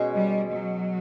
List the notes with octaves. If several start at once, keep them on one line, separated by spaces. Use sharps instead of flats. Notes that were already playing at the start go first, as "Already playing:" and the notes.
Already playing: B2 G#3 C#4
G3
F#3